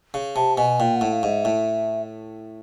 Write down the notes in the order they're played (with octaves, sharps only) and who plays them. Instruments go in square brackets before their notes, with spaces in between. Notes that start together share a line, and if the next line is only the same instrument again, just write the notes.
[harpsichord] C#3
[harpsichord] C3 [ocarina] A5
[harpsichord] B2 [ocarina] G#5
[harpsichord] A#2 [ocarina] G5
[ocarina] F#5
[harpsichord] A2
[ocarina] F5
[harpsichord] G#2
[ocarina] E5
[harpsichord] A2